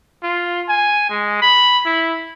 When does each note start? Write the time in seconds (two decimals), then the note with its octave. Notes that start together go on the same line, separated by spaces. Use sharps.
0.23 F4
0.69 G#5
1.10 G#3
1.42 B5
1.86 E4